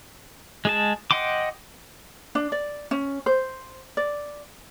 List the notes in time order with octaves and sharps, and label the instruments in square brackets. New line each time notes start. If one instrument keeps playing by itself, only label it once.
[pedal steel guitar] G#3 G#4 A5
D#5 F#5 G5 C6 D6
[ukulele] D4
D5
C#4
C5
D5